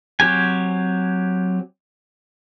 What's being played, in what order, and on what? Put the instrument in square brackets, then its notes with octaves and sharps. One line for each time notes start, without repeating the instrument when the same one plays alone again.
[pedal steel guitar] F#3 C4 G4 G#5